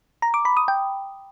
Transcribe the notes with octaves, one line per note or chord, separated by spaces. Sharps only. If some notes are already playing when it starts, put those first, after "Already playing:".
A#5
D6
B5
D#6
G5